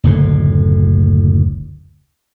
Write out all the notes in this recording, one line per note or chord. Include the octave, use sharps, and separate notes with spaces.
F#1 D2 A2 D3